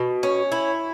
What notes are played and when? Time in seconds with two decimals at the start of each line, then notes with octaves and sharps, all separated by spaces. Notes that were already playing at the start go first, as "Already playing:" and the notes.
Already playing: B2
0.23 C#4
0.52 E4